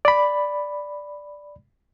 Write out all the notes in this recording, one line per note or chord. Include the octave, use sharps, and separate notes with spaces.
D5 B5